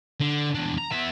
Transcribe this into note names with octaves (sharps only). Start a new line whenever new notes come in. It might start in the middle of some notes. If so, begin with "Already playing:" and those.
D3
E2 D4
A#5
B3 E5